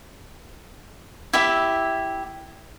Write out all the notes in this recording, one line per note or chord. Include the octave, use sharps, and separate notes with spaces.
E4 G4 E5